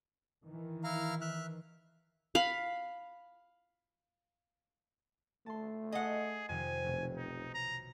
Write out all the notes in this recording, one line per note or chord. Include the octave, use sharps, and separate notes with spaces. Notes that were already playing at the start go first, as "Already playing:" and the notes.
D#3 E3
E4 F5 A#5
E5 F6 F#6
F5 B5
A3 A5 C6
G#4 D#5 F#5
F2 C3 D#3 G#5
F1 B1 B2
D#4
A#5